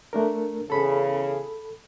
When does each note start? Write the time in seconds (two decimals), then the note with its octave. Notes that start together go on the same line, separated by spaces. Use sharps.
0.13 A3 D4 A#4
0.70 E2 C#3 A4 B5